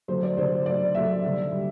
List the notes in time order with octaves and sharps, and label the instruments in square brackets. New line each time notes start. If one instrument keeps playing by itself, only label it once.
[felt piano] D3 F#3 A3 C5
D5
D3 F#3 A3 C5
D3 F#3 A3 D5
D3 F#3 A3 E5
D3 G3
G3